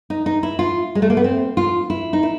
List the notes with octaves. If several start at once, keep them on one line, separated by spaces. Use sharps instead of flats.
D#4
D#4
E4
F4
G#3
A3
A#3
B3
C4
F4
E4
D#4
E4